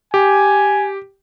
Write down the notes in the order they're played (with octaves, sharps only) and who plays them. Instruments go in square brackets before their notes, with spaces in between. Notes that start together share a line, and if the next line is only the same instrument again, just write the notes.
[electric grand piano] G4 [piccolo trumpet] G#5